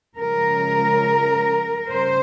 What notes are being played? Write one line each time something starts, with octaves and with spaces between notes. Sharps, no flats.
C#3 F3 G#3 A#4
C#3 G3 C5